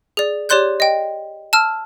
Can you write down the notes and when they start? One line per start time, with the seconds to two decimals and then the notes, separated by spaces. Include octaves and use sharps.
0.17 G#4 D5
0.49 G4 C#5 D5 C6 F#6 G6
0.80 D#5 G5
1.53 A5 E6 F6